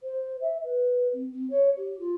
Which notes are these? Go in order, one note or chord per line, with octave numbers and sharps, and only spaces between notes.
C5
E5
B4
C4
C4
C#5
G4
F4